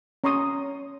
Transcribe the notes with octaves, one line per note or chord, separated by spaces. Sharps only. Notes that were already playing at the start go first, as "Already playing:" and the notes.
C#4 A#5 C6 C#6 D#6